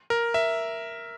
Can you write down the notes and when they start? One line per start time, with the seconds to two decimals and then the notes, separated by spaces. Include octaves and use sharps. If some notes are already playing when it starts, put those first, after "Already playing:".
0.10 A#4
0.34 E5